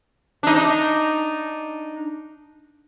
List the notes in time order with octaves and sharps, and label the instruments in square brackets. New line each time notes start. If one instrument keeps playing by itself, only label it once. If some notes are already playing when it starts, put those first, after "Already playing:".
[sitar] D4 D#4